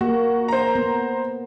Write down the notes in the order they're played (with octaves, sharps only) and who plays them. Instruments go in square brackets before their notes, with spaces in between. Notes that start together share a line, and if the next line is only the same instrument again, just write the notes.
[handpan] A#3 [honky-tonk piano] F#4
[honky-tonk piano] C5 A#5
[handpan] B3